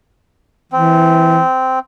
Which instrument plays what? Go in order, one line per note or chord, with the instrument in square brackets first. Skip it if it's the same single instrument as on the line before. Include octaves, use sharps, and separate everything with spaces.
[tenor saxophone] E3 [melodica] C4